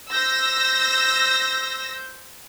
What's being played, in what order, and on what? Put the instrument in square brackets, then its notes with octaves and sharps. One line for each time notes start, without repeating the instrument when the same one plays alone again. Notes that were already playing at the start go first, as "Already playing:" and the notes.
[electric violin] C5 G6 [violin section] E6 A#6